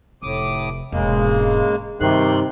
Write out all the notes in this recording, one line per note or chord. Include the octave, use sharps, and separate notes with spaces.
F1 A2 D6 D#6
E1 G#2 C#3 G#3 A#3
G2 C3 D#3 G3 C6 F#6